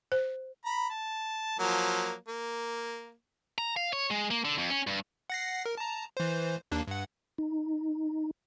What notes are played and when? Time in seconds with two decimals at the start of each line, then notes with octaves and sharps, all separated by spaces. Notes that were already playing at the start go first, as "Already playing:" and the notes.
0.12 C5
0.66 A#5 B5
0.90 A5
1.59 F3 F#3 A#3
2.28 A#3
3.58 A#5
3.77 F5
3.93 C#5
4.11 G#3
4.31 A#3
4.45 D3
4.58 F2
4.70 C#4
4.87 G2
5.30 F#5 A#6 C7
5.66 A#4
5.77 A5 A#5
6.17 E3 C5
6.72 D#2 A#3 D4
6.87 G2 F#5
7.38 D#4